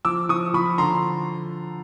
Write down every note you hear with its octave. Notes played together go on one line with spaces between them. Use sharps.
F3 D6 E6
F3 C#6 D#6
F3 B5 C#6
D3 A#5 C6